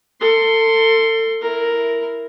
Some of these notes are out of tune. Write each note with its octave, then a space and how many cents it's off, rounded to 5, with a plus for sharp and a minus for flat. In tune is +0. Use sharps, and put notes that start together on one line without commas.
A4 +35 C6 +0
E4 +0 A#4 +0